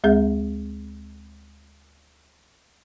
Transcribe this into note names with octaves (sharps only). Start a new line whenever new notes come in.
D2 G#3 C4 G#4 E5 G6